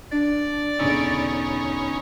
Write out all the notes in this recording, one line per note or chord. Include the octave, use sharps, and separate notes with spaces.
D4 D5
E1 D3 C#4 D#4 B5 E6